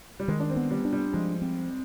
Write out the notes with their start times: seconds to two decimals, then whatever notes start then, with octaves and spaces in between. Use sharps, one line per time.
0.20 G3
0.28 D#3 G#3
0.40 D4
0.50 C4
0.56 B3
0.71 G3
0.85 D4
0.93 G3
1.13 F3 G#3
1.42 C4